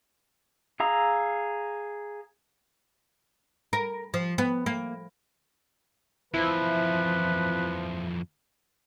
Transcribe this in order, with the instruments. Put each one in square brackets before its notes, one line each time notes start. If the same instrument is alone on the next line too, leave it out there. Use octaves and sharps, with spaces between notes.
[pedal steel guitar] G#4 F5 A#5 E6
[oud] A#4
F3
B3
A#3
[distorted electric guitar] F2 E3 [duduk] F3 [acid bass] E4 [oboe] B4